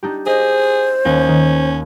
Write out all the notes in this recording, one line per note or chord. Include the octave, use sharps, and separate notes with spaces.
D4 D#4 G4
G#4 C5 D#5
D#2 C#4
D#3